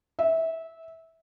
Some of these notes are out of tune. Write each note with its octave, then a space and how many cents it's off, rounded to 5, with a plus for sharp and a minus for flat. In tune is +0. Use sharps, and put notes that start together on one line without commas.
E5 -20